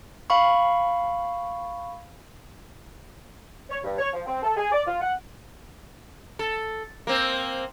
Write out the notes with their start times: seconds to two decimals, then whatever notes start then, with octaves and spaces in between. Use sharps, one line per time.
0.30 F5 B5 C#6
3.70 C#5
3.84 G2
3.98 C#5
4.13 F3
4.26 C4
4.42 A4
4.57 G#4
4.72 D5
4.87 F4
5.01 F#5
6.39 A4
7.07 A#3 C4